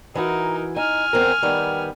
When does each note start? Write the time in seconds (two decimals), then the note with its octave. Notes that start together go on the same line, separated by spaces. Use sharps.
0.15 E3 D#4 F#4 A#4 G#5
0.76 D#4 G#5 F6
1.13 E2 C4 A#4
1.42 D#3 G3 B3